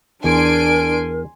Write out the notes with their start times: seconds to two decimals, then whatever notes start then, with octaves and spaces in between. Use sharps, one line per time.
0.24 E2 D4 A#4 G#5 C6 D7